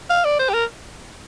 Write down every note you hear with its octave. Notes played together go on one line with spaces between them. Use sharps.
F5
D5
C5
G4
A#4